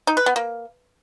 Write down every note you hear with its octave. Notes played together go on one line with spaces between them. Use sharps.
D#4
B4
B3
A#3